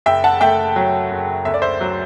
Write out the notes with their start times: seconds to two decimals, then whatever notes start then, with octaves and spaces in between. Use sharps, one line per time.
0.06 F#1 E5 G5
0.24 F#5 A5
0.41 A3 E5 G5
0.76 F#3
1.11 F#1
1.45 D2 E5
1.54 D5
1.62 C5 E5
1.81 F#3